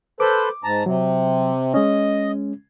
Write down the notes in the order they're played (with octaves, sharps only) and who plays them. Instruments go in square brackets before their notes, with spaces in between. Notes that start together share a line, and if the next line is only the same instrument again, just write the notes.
[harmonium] A4 B4 C5 [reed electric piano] D6
[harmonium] G#2 A5 A#5
[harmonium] C3 [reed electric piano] F#3
[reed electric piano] G#3 C#4 [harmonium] D#5